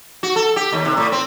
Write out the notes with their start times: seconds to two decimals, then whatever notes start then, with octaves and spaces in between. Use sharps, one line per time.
0.23 F#4
0.36 A4
0.56 G4
0.72 D#2
0.85 C3
0.97 A2
1.12 C4